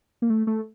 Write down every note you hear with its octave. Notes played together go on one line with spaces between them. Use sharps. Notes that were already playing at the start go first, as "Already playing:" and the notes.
A#3
A3
A3